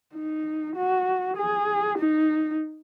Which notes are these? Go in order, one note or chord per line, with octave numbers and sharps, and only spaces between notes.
D#4
F#4
G#4
D#4